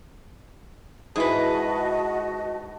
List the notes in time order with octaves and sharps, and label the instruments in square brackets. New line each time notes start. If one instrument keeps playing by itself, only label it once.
[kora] G#2 E3 [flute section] F#4 D#5 A5 [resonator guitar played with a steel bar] G#4 B4